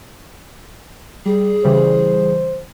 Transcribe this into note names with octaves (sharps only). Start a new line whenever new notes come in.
G3 G#4
C#3 E3 G3 C5